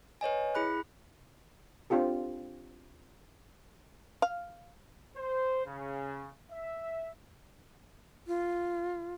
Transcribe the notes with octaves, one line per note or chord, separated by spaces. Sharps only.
B4 C#5 D#5 G#5
E4 G#4 B5 F#6
C4 D4 F4 G4 A4
F5
C5
C#3
E5
F4